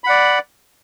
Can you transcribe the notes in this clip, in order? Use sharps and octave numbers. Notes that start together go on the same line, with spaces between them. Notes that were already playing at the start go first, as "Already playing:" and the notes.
D5 F#5 B5